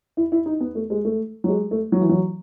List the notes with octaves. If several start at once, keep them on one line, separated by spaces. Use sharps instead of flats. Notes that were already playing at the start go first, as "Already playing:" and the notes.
E4
E4
D#4
B3
A3
G#3
A3
F#3
G#3
A3
F#3
E3
F#3